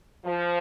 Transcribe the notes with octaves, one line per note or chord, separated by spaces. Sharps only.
F3